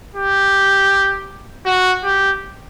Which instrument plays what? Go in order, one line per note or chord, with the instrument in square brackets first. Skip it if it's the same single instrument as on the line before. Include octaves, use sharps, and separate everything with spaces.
[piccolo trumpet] G4
F#4
G4